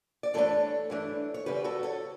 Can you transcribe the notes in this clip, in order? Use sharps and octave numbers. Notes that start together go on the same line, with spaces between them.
D5
G2 E3 A3 D4 A4 C#5
G2 E3 A3 D4
C#5
E2 C#3 G3 G4 B4
F#4 A4
A4 C#5